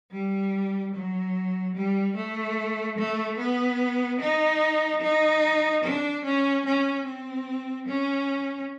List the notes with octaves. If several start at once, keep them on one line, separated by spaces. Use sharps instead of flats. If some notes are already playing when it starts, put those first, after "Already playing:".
G3
F#3
G3
A3
A3
B3
D#4
D#4
D4
C#4
C#4
C4
C#4